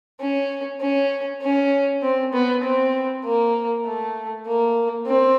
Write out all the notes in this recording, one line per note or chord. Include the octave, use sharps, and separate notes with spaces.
C#4
C#4
C#4
C4
B3
C4
A#3
A3
A#3
C4